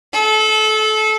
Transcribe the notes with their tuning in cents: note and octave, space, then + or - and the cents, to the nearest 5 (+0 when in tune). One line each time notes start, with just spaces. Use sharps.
A4 -25